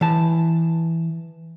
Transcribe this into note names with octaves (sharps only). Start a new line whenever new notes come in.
E3 A5